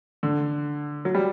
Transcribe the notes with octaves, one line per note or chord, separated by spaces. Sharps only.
D3
F#3
G3